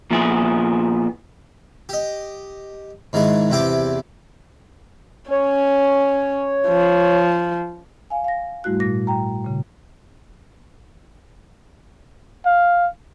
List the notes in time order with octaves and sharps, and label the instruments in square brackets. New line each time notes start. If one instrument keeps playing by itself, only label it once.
[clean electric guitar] A#2 F3 B3 E4 G#4
[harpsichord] G4 D#5
G#2 D#3 E3 G#3 G#4
E2 C3 E4 G4 G5 D6
[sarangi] C#4 [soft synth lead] C#5
[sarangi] F3
[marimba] F5 G#5
F5 A#6
G#2 G3 A3 E4 F#4 F#6
A#2 A#6
G5 A#5
A#2 C#3
[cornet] F5